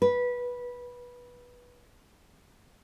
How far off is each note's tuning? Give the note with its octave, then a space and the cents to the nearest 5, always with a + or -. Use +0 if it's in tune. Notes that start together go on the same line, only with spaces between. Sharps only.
B4 -15